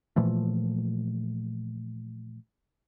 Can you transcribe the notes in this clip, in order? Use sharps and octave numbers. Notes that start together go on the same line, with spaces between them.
A#2 E3 F3 A3